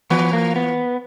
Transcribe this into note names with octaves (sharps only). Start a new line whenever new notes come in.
E3 B3
A#3
B3